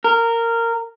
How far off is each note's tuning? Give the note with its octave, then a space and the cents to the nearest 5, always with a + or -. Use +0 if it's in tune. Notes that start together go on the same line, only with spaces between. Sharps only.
A#4 -15